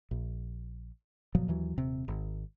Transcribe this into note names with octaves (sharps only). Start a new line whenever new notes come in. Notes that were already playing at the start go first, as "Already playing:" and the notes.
A#1
F#1 A#2 F3 F#3
D#2 E3 F#3
D#1 C3
G#1